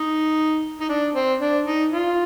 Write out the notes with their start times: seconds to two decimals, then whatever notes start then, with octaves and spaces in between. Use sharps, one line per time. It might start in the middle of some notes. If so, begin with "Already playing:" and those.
Already playing: D#4
0.81 D#4
0.89 D4
1.15 C4
1.41 D4
1.66 D#4
1.92 F4